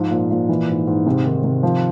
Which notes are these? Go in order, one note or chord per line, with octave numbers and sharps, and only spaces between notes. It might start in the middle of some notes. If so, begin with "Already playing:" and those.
Already playing: G#2 F3
A#2
A#2
E3
G#2
G#2
C3
D#3
C3
F3